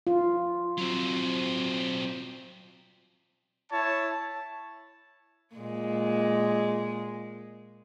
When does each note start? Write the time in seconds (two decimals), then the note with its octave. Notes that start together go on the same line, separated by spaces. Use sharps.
0.07 F4
0.77 F#3 C4
3.70 E4 C#5 A5
5.55 A#2 G#3